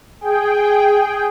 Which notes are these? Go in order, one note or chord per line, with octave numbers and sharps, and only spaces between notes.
G#4 G5